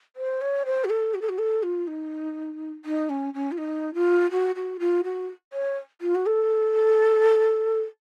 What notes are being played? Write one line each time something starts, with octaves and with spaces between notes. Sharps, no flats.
C5
C#5
C5
F#4
A4
F#4
A4
F#4
A4
F4
D#4
D#4
C#4
C#4
F4
D#4
F4
F#4
F#4
F4
F#4
C#5
F4
F#4
A4